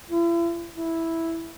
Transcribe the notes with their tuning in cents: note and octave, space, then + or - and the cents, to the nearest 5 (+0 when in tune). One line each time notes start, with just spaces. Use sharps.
E4 +40
E4 -5